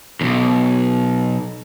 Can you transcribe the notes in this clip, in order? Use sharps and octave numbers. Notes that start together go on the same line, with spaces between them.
B1 E2